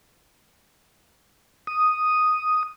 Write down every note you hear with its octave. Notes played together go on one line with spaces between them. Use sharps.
D#6